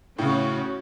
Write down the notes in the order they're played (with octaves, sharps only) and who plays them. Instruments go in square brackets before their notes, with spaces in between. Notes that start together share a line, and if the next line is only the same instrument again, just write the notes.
[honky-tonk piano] A2 C#3 [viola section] C#4 F#4